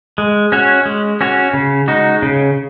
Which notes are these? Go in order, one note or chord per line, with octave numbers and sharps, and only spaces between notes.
G#3
C#4 F#4 C#5
G#3
C#4 F#4 C#5
C#3
G#3 D#4 F#4
C#3